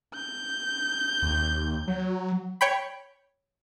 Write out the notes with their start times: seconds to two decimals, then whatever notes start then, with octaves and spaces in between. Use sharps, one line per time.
0.16 G6
1.22 D#2
1.88 F#3
2.61 C#5 G5 B5